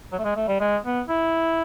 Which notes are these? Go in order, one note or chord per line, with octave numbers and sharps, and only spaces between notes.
F#3
A3
G#3
A3
G3
G#3
B3
E4